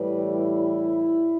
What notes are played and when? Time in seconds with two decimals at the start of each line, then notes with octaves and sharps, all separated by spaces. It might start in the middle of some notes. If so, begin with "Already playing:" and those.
Already playing: A2 E3 G3 B4
0.25 E4